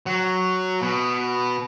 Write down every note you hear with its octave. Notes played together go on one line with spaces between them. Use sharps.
F#3
B2